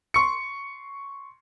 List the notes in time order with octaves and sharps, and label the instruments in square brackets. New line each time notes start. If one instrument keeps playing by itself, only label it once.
[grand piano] C6 C#6 C#7